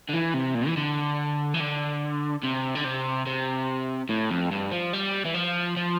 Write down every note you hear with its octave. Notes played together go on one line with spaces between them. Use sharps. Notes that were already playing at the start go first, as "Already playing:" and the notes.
D3
E3
C3
A#2
E3
D3
E3
D3
C3
D3
C3
C3
A2
F2
G2
F3
G3
E3
F3
F3